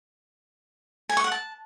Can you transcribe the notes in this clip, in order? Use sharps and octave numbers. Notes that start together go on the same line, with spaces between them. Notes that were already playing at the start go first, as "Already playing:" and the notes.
G#5
C#6
F#5
A5